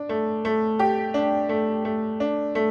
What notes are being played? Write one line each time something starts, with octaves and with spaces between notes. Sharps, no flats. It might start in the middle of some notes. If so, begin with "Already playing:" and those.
Already playing: D4
A3
A3
G4
D4
A3
A3
D4
A3